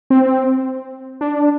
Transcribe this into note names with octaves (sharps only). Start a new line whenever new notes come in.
C4
D4